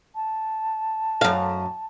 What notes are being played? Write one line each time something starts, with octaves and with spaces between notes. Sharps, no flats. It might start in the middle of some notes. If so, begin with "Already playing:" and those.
A5
F#2 F5